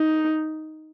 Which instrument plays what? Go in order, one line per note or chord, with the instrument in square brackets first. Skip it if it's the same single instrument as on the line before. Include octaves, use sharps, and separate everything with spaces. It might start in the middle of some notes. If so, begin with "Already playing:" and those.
Already playing: [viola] D#4